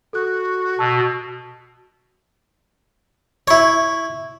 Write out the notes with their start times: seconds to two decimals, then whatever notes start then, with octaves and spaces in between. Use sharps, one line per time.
0.13 F#4 A4 F#6
0.79 B2 A5 E6
3.48 E4 C#5